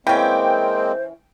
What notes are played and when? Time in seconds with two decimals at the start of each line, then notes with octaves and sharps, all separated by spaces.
0.07 E3 G#3 A#3 C4 C#4 C5 G5